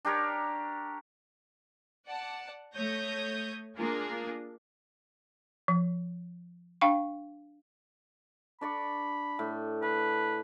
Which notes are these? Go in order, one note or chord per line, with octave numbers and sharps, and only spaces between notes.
D4 G4 A#4 C#5
D5 F#5 A5
A3 C#5 D#6 G6 A#6
A#3 D4 F4 G#4 A#4
F3
D4 F5 G5 C#6
D4 D5 B5 C#6
A2
B4 A5